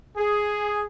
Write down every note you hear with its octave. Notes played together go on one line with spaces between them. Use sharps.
G#4